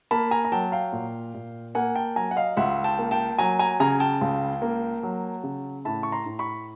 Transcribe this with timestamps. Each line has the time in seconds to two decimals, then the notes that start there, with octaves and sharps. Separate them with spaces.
0.11 A#3 A5 B5
0.31 G#5 A#5
0.45 A#5
0.52 F#3 G5 A5
0.72 F5 G5
0.92 A#2
1.34 A#2
1.75 A#3 F#5 G#5
1.95 G5 A5
2.16 F#3 G#5 A#5
2.31 F#5
2.36 D#5 F5
2.57 C#2 E5 F#5
2.84 G5 A5
2.99 A#3
3.11 G5 A5
3.39 F#3 G#5 A#5
3.59 G#5 A#5
3.80 C#3 G#5 A#5
4.00 G5 A5
4.21 C#2
4.62 A#3
5.03 F#3
5.43 C#3
5.85 A2 A5 B5
6.03 C#6
6.12 A#5 C6
6.26 A2
6.39 B5 C#6